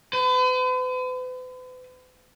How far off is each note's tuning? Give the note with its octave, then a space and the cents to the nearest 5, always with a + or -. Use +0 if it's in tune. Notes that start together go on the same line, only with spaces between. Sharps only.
B4 +45